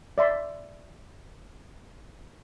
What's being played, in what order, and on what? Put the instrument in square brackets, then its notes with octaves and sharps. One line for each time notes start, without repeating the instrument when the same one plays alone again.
[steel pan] D5 E5 C6